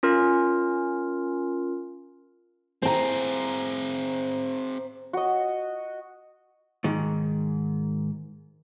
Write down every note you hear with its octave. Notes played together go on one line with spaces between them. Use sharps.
C#4 F4 A#4
C4 G#4 C5 A#5
F#4 D#5
G#2 D#3